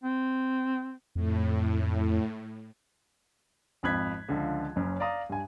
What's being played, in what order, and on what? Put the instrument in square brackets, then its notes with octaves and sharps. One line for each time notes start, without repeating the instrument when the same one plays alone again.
[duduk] C4
[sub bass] F2 [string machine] A2
[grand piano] G#1 F2 B5 F#6 G#6 B6
C#2 D3 F3
F#1 F#2 C#4
D5 F5 A#5 D#6
G2 G#5